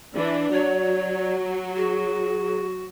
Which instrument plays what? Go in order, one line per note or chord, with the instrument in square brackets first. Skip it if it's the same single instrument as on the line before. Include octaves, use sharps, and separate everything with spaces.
[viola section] E3 D4 [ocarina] D5
[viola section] F#3 [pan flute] C#5
[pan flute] F#4 [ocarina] G#4